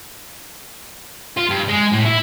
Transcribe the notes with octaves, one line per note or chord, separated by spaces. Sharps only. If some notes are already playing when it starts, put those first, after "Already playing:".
F4
G2
G#3
A2
E4